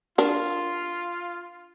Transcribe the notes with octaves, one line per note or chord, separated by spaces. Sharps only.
D4 F4 A#4